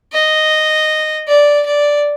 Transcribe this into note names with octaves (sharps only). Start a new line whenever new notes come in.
D#5
D5
D5